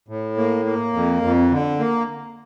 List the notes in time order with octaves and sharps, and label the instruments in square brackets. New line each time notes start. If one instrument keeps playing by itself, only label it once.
[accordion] A2
A#3
A#3
F2
F2
D3
A#3